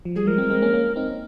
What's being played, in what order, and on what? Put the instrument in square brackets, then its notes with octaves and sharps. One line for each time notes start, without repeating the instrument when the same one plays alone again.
[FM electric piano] F3
[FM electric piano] G3 [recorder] G#4
[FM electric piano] F3 G#3 [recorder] A#4
[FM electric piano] G#3 C4
G#3 C4
A#3 C#4
A#3 C#4
C4 D#4